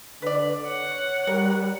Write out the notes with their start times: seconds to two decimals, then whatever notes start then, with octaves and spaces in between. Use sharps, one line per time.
0.22 D3 B4 D5
0.67 C#5 F#5
1.27 G3 A#4